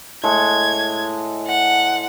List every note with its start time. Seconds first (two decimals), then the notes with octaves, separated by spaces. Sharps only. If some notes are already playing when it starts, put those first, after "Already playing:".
0.24 A2 G#3 A4 G#6
1.47 F#5